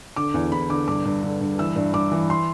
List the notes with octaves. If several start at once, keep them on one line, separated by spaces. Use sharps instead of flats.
D3 D6
E2
E2 B5
D3 D6
G2 D6
G2
D3
G2
E3 E6
G2
G2 D6
E3
C6